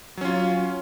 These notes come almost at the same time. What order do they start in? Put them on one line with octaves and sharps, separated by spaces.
F#3 C#4 F4